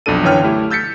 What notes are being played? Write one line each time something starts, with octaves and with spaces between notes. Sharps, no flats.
B1 F2 D4 A4 D#7
F#2 D3 E3 C#5 G5 F6
A3 E4 G4
E6 G6 A6 B6 C#7